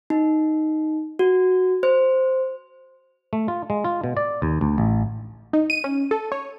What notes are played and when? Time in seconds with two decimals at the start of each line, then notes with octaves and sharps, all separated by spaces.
0.10 D#4
1.19 F#4
1.83 C5
3.33 A3
3.48 F4
3.70 G#3
3.85 F4
4.04 B2
4.17 D5
4.42 D#2
4.61 D2
4.78 A1
5.53 D#4
5.70 D#7
5.84 C#4
6.11 A4
6.32 C#5